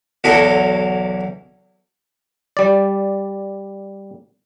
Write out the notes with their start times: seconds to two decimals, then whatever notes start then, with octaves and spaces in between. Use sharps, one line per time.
0.24 B1 E2 F#3 E4 A4 D#5
2.57 G3 D5